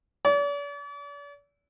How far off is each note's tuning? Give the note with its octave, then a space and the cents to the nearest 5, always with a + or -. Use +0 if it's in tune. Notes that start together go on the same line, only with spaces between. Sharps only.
D5 -45